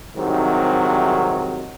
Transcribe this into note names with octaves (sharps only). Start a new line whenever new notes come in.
C2 G#2 C3 D#3 F#3